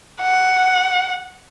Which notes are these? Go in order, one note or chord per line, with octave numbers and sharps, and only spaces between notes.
F#5